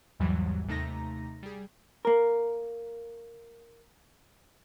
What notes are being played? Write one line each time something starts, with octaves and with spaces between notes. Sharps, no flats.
A#1 E2 G#2 E3 F#3 G3
D#2 C3 A3 D#4 A#5 A#6
G3 G#4
A#3 A#4